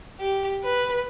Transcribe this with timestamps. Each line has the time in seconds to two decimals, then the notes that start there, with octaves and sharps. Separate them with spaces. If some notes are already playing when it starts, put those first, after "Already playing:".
0.20 G4
0.64 B4